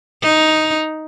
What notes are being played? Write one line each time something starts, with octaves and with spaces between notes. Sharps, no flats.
D#4